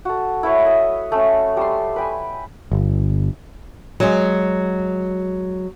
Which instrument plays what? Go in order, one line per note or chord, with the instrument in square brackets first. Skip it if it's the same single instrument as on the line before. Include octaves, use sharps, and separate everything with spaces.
[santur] F#4 A4
E4 B4 C#5
D#5 E5
A3 C#4
G3 A5 C6
B4 G5 G#5
[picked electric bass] G1
[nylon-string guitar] F#3 G#3